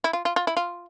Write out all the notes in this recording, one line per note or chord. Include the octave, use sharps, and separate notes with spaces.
E4
F4
F4
F4
E4
F4